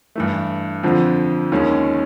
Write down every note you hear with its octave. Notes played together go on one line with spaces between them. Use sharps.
G2 E3 A3
F2 D3 F3
D#2 D#3 G#3 C#4